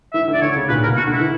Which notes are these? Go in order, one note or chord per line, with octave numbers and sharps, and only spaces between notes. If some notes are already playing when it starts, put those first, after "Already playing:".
E3 E5
D3
D5
D3 C#5
C#3
A#2 B4
A#4
B2
F#4
D3
E4
E3